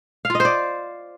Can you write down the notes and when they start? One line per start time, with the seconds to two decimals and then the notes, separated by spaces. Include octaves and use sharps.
0.25 F5
0.30 F4
0.35 D#5
0.40 C5
0.45 D5